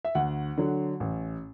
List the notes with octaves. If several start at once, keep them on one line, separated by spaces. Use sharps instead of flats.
E5
D2 F#5
D3 F#3
A1